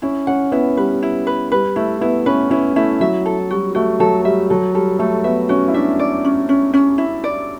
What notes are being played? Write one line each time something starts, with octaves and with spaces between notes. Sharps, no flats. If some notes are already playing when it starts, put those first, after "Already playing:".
C#4 E4
C#4 F#5
B3 E4
G3 B4
E4
B4
G3 B4
A3 E4
B3 E4
C#4 B4
C#4 E4
A3 E4
F#3 E5
A4
G3 F#4
A3 F#4
F#3 A4
G3 E5
F#3 A4
G3 A4
A3 A4
B3 E5
C#4 F#4
E4
D4 E5
D5
C#4
C#4
C#4
E4
D5